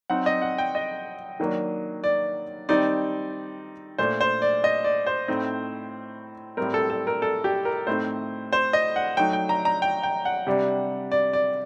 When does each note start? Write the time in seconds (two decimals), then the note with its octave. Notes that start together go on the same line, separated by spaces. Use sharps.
0.10 F#3 C4 D#4 F#5
0.26 D#5
0.42 F#5
0.58 G5
0.75 D#5
1.40 D#3 F#3 A#3 D4
2.04 D5
2.69 D#3 G3 C4 D#4 D5
3.98 A#2 A3 D4 C5
4.21 C5
4.42 D5
4.64 D#5
4.84 D5
5.07 C5
5.28 A2 A3 C4 D#4
6.57 A2 G3 C4 A#4
6.74 A4
6.90 A4
7.07 A#4
7.22 A4
7.44 G4
7.65 A#4
7.87 A2 A3 C4 D#4 C5
8.53 C5
8.73 D#5
8.96 F#5
9.17 F#3 A3 D#4 G5
9.33 G5
9.49 A#5
9.65 A#5
9.82 G5
10.03 G5
10.25 F#5
10.47 C3 G3 D4
11.12 D5
11.33 D5